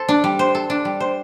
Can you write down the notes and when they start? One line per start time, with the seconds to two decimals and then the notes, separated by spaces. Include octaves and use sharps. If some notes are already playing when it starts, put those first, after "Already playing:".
Already playing: A4 C5
0.09 D4
0.24 G3
0.39 C5
0.55 A4
0.70 D4
0.85 G3
1.00 C5